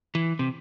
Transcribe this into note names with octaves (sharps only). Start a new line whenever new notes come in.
E3
C3